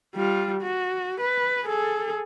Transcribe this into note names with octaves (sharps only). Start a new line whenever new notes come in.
G3 F4
F#4
B4
G#4 A4